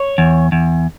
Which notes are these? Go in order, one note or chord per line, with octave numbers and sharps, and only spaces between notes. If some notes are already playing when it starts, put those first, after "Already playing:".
Already playing: C#5
E2
E2